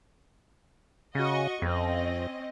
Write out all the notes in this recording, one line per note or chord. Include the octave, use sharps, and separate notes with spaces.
C#3 F#4 D#5 C#6
F2 C4 C#4 D#5